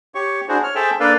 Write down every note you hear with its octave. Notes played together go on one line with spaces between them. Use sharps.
G4 C#5 C#6
D4 E4 F#4 G#4 C5
C#5 F6
G#4 A4 C5 E5 G5 A5
A#3 D4 A4 B4 D5 F5